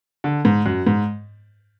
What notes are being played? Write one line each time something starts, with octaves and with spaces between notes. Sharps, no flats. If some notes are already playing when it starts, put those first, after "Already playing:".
D3
G#2
F#2
G#2